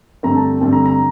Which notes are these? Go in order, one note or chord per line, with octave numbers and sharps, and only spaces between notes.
G2 D3 A3 C4 A#5
A5
G2 D3 A3 C4 A5
A#5
A#5